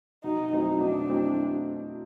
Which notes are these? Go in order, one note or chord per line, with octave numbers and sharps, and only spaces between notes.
B2 D#4
F#3 A3 C4 D#4 E4
B2 D4
F#3 A3 C4 E4